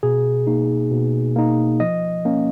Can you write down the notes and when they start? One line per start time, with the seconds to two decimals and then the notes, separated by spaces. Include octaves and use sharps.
0.03 B2 G#4
0.47 A#3 D#4
0.91 B2
1.36 A#3 D#4
1.80 F3 D#5
2.25 A#3 C#4